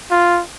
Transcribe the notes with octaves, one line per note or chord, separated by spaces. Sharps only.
F4